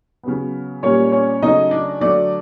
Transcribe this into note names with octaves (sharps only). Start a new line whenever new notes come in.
C#3 F#3 B3
A#2 G3 A#3 C#4 C#5
C#4 C#5
C#3 F#3 A3 D#4 D#5
D4 D5
D3 F#3 A3 D4 D5